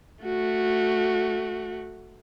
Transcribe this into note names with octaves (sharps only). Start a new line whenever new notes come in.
A3 F#4